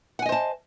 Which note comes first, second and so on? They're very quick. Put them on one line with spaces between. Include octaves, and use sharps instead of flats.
F#5 G#5 D#5 C5 A5